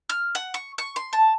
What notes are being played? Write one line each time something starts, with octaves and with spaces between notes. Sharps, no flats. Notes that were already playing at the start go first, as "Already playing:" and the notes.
F6
F#5
C#6
C#6
C6
A5